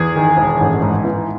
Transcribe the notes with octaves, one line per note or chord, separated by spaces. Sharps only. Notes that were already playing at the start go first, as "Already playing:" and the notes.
Already playing: E2 G#4
D#3
E1
A1
G#2
E3